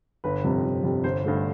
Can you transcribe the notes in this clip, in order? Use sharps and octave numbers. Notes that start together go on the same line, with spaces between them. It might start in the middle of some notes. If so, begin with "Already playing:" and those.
G1 B4
F2 C3 G3
G1
F2 C3 G3
G1 C5
G2 D3 A3